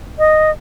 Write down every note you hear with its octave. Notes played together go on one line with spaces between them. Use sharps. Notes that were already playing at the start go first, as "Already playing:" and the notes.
D#5